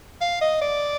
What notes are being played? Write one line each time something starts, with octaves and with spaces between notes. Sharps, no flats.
F5
D#5
D5